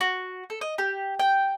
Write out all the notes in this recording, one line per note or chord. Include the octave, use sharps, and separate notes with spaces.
F#4
A4
D#5
G4
G5